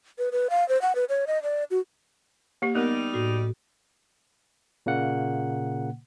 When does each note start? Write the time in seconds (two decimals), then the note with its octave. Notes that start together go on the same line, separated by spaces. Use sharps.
0.18 B4
0.32 B4
0.50 F5
0.69 C5
0.82 F#5
0.95 B4
1.09 C#5
1.27 D#5
1.43 D5
1.71 F#4
2.62 A#3 G4
2.75 G3 B3 D#4 A#4
3.14 A2 F#4
4.86 A#2 C#3 A#3 F#5